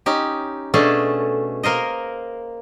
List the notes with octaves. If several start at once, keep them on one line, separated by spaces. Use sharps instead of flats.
C#4 D#4 G4
B2 A3 C#4 D4 G#4 A4
A#3 A#4 C5 D#5